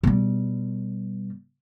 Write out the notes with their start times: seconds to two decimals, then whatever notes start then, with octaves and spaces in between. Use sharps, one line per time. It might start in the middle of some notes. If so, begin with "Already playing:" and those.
0.03 B2 G3